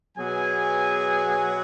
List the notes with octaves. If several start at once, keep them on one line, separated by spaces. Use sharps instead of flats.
B2 F#3 B3 G#4 G#5